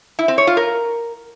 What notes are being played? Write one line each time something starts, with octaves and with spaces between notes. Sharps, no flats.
E4
C4
C#5
F4
A#4